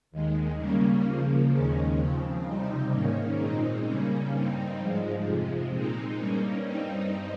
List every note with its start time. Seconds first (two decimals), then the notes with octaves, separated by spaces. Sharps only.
0.11 D#2 D#3 G#3
0.57 C#3 G3 A#3 C#4
1.05 C#3 F3 A#3
1.52 D#2 D#3 G#3 C#4
1.97 C#3 F3 C4
2.44 C3 G3 C4 D#4
2.91 G#2 D#3 A#3 C#4
3.37 A#2 G#3 C4 D#4
3.85 C#3 G3 A#3 C#4
4.32 G2 G3 C4 D#4
4.78 G#2 F3 G#3
5.24 F2 C3 F3 G#3
5.72 A#2 G#3 C4 D#4
6.18 G2 G3 A#3 C#4
6.65 G2 G3 C4 D#4